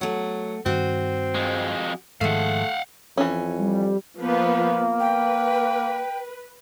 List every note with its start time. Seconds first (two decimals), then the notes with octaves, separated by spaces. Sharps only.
0.01 F#3 A3 F#5
0.66 G2 D#3 C4 F#4
1.35 F2 G#3
2.21 G#2 D#3 F3 G#3 A3 F5 F#5
3.17 F2 E3 C#4
3.58 G3
4.19 F3 A#3 B3 B4
5.00 B4 G5